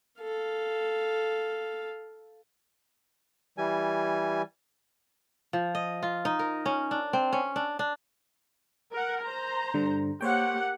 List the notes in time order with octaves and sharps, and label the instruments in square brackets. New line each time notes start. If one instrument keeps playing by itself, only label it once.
[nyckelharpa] A4 F5
[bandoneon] E3 G3 G#5
[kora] F3
D#5
F4
D#4
A#4
C#4
D4
C4
C#4
D4
D4
[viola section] A#4 F#5
C5 A#5
[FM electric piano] G2 D3
[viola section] A#3 G4 F#5 [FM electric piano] C5 C#5 G5